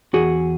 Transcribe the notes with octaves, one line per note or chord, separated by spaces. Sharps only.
E2 F#4 G#4